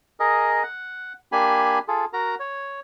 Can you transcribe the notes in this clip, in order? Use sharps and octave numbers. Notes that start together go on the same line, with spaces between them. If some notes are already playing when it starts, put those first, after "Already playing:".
G#4 A#4 D#5
F#5
A#3 D4 G4 G#5 B5
F4 G#4 A4
F#4 A#4 A#5
C#5